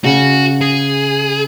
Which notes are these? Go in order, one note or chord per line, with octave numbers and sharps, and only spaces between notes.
C#3 F#4
G#4